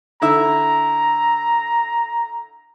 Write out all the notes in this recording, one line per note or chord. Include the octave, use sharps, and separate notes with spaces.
D3 E4 E5 A#5